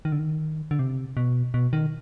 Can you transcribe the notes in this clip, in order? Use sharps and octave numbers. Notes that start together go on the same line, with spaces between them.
D#3
D3
D#3
D3
C3
B2
B2
D#3